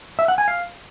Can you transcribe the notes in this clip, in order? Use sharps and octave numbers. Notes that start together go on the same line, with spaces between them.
E5
F#5
G#5
F5